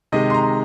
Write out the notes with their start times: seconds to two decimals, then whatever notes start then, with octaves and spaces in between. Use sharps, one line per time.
0.12 C3 D#3 G#3 D#5
0.30 C6
0.34 A#5